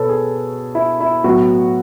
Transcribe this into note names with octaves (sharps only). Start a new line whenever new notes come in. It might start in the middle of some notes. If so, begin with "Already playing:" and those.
Already playing: B2 B3 A4 B4 C#5
G#4
E4
E4
A2 F#3 B3 F#4